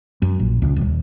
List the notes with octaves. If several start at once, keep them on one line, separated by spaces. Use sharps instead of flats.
F#2
A#1
C#2
D#1